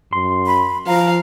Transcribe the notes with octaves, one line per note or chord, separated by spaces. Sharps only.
F#2 C6
B5
F3 F5 A#5